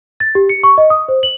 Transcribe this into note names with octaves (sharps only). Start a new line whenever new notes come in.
A6
G4
C#7
C#6
D#5
D#6
C5
F#7